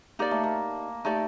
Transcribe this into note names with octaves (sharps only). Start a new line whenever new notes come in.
A#3 D#4 G4 D5
A3
A#3
A3 D#4 G4 D5